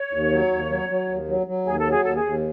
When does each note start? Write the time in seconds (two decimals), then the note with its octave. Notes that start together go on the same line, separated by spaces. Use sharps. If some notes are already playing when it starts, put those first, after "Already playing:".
Already playing: C#5
0.13 D#2
0.32 F#3
0.51 D#2
0.70 F#3
0.89 F#3
1.08 D#2
1.28 F#3
1.47 F#3
1.65 D#2 G#4
1.78 A4
1.85 F#3
1.91 G#4
2.03 D#2 A4
2.16 G#4
2.23 D#2